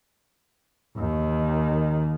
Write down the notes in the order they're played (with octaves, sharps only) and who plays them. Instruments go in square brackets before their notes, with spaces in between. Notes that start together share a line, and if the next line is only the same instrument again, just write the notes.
[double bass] D#2 D#3